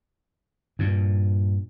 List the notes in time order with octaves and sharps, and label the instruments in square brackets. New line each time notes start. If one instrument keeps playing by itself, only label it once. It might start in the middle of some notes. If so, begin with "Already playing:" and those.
[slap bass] G2 A#2